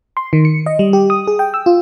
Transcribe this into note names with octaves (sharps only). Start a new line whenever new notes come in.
C6
D#3
C#7
D#5
G3
G4
D#6
G#4
G5
E6
F4